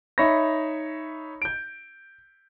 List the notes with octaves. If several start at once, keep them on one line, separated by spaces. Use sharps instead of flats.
D#4 C#5 E5 B5 A#6
G6 D7